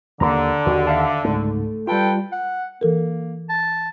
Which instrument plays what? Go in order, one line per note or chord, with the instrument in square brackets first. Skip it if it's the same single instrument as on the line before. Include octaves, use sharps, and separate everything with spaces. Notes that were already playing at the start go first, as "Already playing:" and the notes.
[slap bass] D#2 G3 A#3 [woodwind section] D3 [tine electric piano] A#5
[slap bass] D#2 D#3 [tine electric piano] F#4
[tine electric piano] E5 F5 A5
[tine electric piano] C#2 G#2 [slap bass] A3
[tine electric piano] G3 F4 [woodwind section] A4 B4 G5
[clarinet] F#5
[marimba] E3 A4 A#4 [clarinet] A#3
[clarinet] A5